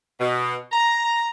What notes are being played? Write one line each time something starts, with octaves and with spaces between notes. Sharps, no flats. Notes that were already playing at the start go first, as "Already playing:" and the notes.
B2
A#5